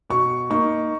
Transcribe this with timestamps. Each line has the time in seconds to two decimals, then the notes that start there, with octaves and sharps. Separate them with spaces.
0.10 B2 C#6
0.50 A#3 D#4 C#6